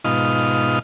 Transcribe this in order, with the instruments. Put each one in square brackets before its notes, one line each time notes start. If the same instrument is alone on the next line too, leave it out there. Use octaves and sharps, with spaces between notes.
[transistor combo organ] G#2 B2 D#4 F4 D#5 F6